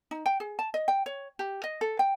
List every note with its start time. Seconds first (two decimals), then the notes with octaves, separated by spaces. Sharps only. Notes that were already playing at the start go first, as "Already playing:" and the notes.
0.11 D#4
0.26 G5
0.40 G#4
0.59 A5
0.74 D#5
0.88 G5
1.06 C#5
1.39 G4
1.64 D#5
1.81 A4
1.99 G5